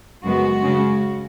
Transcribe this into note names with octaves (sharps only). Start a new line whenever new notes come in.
F#2 C#3 G#3 B3 F#4
C#3 G#3 C#4